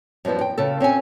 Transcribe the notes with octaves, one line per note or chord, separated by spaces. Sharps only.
F#2 F3 G3 B3 E4
G5
C#3 F4 A4
C4 C#4 A4 G#5